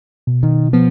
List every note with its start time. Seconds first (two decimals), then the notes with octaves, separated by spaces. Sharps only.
0.27 B2
0.43 D#3
0.73 F3 B3